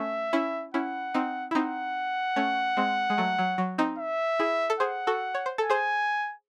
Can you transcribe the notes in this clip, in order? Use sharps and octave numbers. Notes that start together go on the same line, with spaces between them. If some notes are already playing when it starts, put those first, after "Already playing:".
Already playing: A3 C#4 E5
C#4 E4
C#4 E4 F#5
C4 D#4
E4
C4 D#4 F#5
A3 C#4
G#3 C4
G#3
F#3 A3
F#3
F#3
C4 D#4
E5
E4 G#4
A4
G#4 C5 F#5
F#4 A4
C#5
C5
A4 G#5
G#4 C5